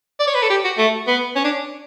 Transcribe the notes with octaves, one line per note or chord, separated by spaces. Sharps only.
D5
C#5
B4
A4
G4
F#4
A3
B3
C#4
D4